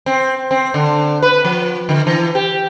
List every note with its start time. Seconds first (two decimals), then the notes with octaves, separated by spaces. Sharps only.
0.06 C4
0.51 C4
0.74 D3
1.22 B4
1.45 F3
1.89 D3
2.07 E3
2.35 G4